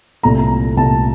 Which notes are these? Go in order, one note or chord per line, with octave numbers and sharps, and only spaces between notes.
C2 A#2 A3 A#5
C2 A#2 A3 A5